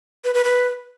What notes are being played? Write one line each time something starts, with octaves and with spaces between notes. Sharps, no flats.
B4
B4
B4